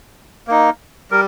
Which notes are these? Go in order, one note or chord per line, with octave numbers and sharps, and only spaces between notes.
A#3 D#4
G3 A#4